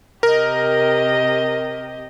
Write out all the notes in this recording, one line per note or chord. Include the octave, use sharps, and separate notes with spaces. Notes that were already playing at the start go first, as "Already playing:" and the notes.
C3 G4 A#4 D#5